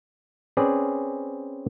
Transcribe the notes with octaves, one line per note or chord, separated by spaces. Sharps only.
C4 C#4 G#4 B4 D5